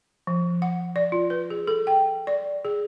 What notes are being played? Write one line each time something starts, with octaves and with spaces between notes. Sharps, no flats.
F3
F#5
D5
F4
B4
G#4
A4
G5
D5
G#4